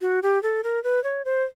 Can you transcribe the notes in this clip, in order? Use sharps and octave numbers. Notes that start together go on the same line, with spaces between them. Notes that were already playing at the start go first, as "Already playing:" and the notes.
F#4
G4
A4
A#4
B4
C#5
C5